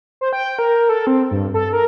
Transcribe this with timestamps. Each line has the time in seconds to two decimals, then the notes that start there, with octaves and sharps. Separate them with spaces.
0.21 C5
0.33 G5
0.59 A#4
0.89 A4
1.07 C4
1.31 G2
1.54 A4
1.73 A#4